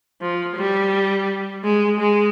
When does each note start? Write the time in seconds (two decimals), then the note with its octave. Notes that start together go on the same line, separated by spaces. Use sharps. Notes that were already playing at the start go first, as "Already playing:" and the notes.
0.21 F3
0.56 G3
1.64 G#3
1.99 G#3